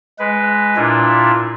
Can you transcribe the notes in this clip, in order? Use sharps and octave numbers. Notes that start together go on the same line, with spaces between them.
G#3 B4
A#2 D4 E4 F4